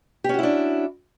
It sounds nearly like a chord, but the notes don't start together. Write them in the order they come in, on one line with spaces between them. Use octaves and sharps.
G4 C#4 F#4 E4 D4